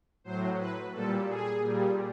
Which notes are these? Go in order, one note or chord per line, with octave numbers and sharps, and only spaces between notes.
A2 F#3 C5
B4
A#2 G3 A4
G#4
A#2 G3